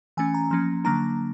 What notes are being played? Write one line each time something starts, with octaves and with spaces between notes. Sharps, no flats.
E3 A3 C#4 G#5
A#5
F3 A#3 C#4
D3 F#3 A#3 D4 A#5